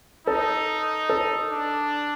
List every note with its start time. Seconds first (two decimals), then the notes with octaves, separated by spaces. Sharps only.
0.27 D#4 A4
1.10 A4
1.50 D4